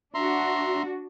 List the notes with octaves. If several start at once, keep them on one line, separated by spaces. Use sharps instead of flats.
D4 F#4 E5 A#5 C6